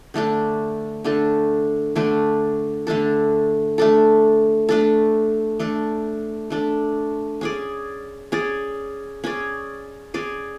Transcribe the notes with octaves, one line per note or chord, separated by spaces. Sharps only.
D3 A3 D4 A4
D3 A3 D4 A4
D3 A3 D4 A4
D3 A3 D4 A4
A3 D4 A4
A3 D4 A4
A3 D4 A4
A3 D4 A4
C#4 G#4 D5
C#4 G#4 D5
C#4 G#4 D5
C#4 G#4 D5